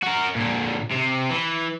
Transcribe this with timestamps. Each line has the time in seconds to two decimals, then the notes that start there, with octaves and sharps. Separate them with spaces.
0.03 F#4 A#4
0.36 A#2 D3
0.92 C3
1.31 E3